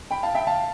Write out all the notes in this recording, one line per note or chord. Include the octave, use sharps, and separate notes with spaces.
G5 B5
F5 A5
E5 G5
F5 A5